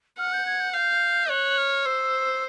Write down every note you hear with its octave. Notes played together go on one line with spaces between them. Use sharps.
F#5 F6
G6
G#6
G6
F5 G6
C#5 F#6
F6
C5 E6